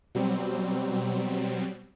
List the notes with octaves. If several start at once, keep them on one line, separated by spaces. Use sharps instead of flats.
B2 F#3 G3 C4